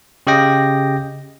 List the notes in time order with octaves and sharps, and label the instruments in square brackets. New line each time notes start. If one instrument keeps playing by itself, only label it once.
[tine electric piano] C#3 G4 D#5 G5 A#6